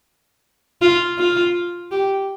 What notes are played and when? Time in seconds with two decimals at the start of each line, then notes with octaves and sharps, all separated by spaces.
0.81 F4
1.18 F4
1.92 G4